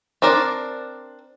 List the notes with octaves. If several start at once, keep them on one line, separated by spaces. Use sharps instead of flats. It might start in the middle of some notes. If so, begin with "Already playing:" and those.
C4 D4 A#4 D5